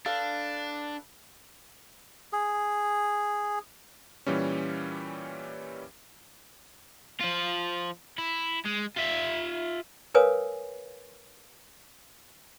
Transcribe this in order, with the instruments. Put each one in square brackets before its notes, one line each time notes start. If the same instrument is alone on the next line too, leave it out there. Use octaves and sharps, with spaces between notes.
[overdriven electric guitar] D4 [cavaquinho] A4 B4 F5
[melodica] G#4
[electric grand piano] A#2 E3 G3 C#4
[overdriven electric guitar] F3 F4
E4
G#3
F4 E5
[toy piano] A#4 B4 C#5 F5 G#5 D#6